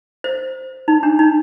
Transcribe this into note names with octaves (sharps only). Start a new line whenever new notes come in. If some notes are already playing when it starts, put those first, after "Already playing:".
C5
D#4
D4
D#4